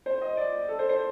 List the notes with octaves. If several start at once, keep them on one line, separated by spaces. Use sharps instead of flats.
C5
D#5
D5
A4
C5
C5